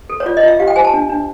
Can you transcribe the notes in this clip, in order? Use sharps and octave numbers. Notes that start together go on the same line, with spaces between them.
A4
C#5
F4 D5
D#5
F4 E5
G4 F5
G5
C5 G#5
A5
D4
D4